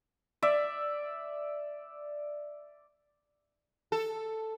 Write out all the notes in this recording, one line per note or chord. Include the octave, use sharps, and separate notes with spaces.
D5 E5
A4